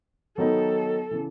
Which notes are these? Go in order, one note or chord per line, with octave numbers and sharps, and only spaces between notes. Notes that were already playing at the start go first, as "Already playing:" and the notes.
D#3 F#3 B3 D#4 A4
C#3 E3